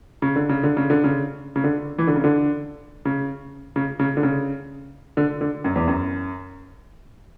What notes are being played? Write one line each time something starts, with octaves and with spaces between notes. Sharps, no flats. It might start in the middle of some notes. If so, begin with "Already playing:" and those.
C#3
D3
C#3
D3
C#3
D3
C#3
C#3
D3
E3
D3
C#3
D3
C#3
C#3
C#3
D3
C#3
D3
D3
F#2
E2
F#2